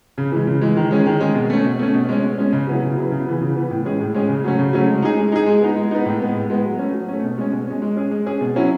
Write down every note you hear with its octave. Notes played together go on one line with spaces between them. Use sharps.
C#3
E3 G#3
C#3
E3 G#3
D#3
G#3 C#4 G#4
D#3
G#3 C#4 G#4
B2
A3 C#4
B2
A3 C#4
B2
G#3 C#4
B2
G#3 C#4
C#3
F#3 B3 E4 G#4
C#3
F#3 B3 E4 G#4
C#3
E3 B3
C#3
E3 B3
A2
G#3 C#4 G#4
A2
G#3 C#4 G#4
C#3
F#3 A3 C#4
C#3
F#3 A3 C#4
G#3
D#4 G#4
G#3
D#4 G#4
G#3
B3 D#4
G#3
B3 D#4
A2
G#3 B3
A2
G#3 B3
F#3
A3 C#4
F#3
A3 C#4
B2
G#3 C#4
B2
G#3 C#4
G#3
C#4 G#4
G#3
C#4 G#4
B2
F#3 C#4 E4